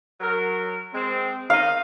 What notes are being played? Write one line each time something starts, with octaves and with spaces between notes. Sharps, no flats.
F#3 A#4
G#3 C4
D#3 C#4 D#4 F5